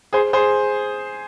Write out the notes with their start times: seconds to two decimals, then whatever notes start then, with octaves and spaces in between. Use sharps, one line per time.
0.13 G#4 C5
0.33 G#4 C5